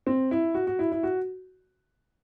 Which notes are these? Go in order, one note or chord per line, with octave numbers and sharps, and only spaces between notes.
C4
E4
F#4
F#4
E4
E4
F#4